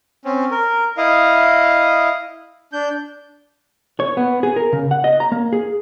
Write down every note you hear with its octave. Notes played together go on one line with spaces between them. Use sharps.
C4 C#4
A#4
E4 D#5 F5
D4 G6
C#5
B3
G#4
A#4
C#3
F#5
D#5
A#5
A#3
G#4